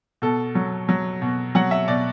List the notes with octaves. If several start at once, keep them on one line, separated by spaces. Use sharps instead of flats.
B2 A4
F#3
F#3
B2
F#3 F#5
E5
B2 D5